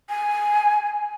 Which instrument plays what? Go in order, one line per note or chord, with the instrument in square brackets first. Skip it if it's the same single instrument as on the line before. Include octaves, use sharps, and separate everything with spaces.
[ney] G#5